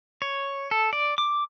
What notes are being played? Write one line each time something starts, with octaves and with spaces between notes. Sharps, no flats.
C#5
A4
D5
D6